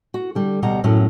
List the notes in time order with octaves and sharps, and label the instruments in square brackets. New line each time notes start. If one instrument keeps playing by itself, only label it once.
[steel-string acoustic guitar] F#4
D3 G3
D2 B2 G3 F#5 A#5
F#2 A2 F#3 C#4